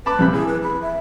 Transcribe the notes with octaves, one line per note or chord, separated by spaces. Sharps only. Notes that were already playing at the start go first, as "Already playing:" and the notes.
B4 A5 B5 D6
A#1 C3 B5
E3 G#4
B4
B5
E5